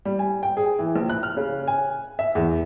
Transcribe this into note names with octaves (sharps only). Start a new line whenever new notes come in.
G3
G#5
G5
G#4
E3
A#1
F#6
F6
C#3
G#5
E5
E2